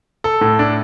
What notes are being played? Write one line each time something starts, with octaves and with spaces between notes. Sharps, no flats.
A4
A2
D4